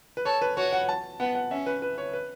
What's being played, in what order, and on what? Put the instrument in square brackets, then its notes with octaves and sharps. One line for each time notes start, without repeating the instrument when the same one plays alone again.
[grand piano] B4
[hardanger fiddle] A4 [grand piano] C#5
[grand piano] B4
[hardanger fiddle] F#4 [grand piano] C#5
[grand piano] F#5
A5
[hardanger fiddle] B3 [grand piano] F#5
[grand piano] F#5
[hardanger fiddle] C#4 [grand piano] E5
[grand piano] B4
B4
C#5
B4